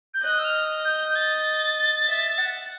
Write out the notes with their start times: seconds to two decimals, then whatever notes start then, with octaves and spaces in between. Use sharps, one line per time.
0.14 G6
0.23 D#5 F#6
0.39 E6
0.44 F6
0.85 G6
1.15 A6
2.07 E5
2.38 F#5